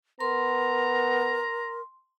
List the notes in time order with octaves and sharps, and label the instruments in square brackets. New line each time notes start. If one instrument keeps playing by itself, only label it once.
[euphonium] B3 [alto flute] A#4 [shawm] A#5 [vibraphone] C6